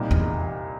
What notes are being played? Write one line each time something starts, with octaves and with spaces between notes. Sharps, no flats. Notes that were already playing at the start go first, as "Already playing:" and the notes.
Already playing: C2 A#2 G3 A#3 D#4
E2